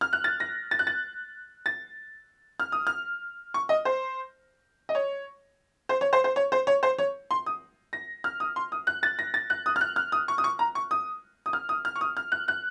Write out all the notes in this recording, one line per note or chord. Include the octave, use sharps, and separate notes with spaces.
F6
F#6
A6
A#6
A6
F#6
A6
A6
F6
D#6
F6
C#6
D#5
C5
D#5
C#5
C5
C#5
C5
C5
C#5
C5
C#5
C5
C#5
C6
D#6
A#6
F6
D#6
C6
D#6
F#6
A6
A#6
A6
F#6
D#6
F6
F#6
F6
D#6
C#6
D#6
C#6
A#5
C#6
D#6
D#6
F6
D#6
F6
C#6
D#6
F6
F#6
F#6